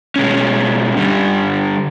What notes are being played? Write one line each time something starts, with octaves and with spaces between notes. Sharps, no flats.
B2 G#3 C#4
G2 D3 G3